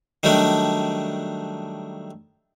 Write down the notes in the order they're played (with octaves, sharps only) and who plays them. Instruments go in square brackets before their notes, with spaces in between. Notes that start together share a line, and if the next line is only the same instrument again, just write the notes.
[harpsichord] D#3 F#3 G3 A3 D4